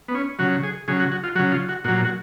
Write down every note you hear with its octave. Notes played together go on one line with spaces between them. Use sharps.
B3
C#4
C#3 F#3 F#4
G#4
C#3 F#3 G#4
F#4
F#4
F4
C#3 F#3 F#4
F4
F#4
A#2 F#3 F#4
F#4